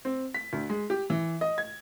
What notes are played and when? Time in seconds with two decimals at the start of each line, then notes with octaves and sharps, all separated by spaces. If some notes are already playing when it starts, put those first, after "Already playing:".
0.05 C4
0.34 B6
0.53 D2
0.70 G#3
0.90 G4
1.10 E3
1.41 D#5
1.58 G#6